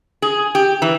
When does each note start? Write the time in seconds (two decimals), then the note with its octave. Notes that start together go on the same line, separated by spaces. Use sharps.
0.22 G#4
0.55 G4
0.82 E3